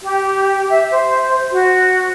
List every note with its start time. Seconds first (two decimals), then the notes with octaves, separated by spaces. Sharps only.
0.03 G4
0.69 E5
0.91 C5
1.52 F#4